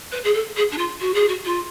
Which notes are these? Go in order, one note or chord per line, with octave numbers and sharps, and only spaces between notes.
B4
G#4
A4
G#4
D4
F4
F#4
G#4
F#4
F4